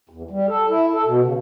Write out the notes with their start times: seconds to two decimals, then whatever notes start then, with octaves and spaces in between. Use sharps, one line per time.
0.09 E2
0.30 G3
0.48 A4
0.69 E4
0.93 A4
1.06 B2
1.24 C#3